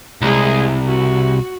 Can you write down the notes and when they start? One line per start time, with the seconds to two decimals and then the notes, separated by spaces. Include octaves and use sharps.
0.21 C2 G#3 G#4
0.86 F#4